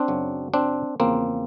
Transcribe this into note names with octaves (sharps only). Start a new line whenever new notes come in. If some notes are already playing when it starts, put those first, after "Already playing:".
Already playing: C4 D4
F#2 C#3 F#3
C4 D4
E2 C#3 F3 A#3 C4